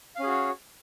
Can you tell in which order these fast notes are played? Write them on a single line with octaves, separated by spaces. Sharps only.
F5 C#4 G#4 F#4 C#5